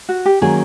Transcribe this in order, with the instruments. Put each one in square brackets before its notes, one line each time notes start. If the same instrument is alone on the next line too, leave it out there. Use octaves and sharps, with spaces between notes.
[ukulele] F#4
G4
[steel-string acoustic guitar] D#3 F#3 A#3 C#4 F#4 [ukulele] G#4